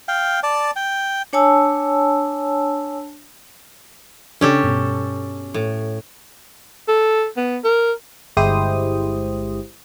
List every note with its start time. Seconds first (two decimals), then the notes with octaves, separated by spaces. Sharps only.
0.08 F5 G5
0.43 D5 A5
0.76 G5
1.33 D4 C#5 G#5 A5 E6
4.41 C#3 C#4 D4 G4 A4
4.64 G2 B2
5.54 A2
6.88 A4
7.37 B3
7.64 A#4
8.37 G1 G#3 E4 G4 C5 D#6